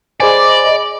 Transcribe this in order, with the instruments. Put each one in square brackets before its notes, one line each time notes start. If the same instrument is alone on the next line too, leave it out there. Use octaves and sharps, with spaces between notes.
[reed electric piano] G#4 C5 G#5 [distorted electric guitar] D5 [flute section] D#5 B5 D6